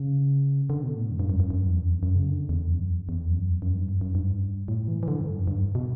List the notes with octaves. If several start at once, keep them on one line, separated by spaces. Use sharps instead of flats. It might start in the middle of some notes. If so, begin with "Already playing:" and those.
Already playing: C#3
D3
B2
A2
F#2
G2
F#2
F#2
F#2
E2
F#2
F#2
C#3
D3
E2
F#2
E2
E2
F#2
E2
F#2
G2
F#2
F#2
G2
A2
E3
E3
D3
G2
F#2
G2
B2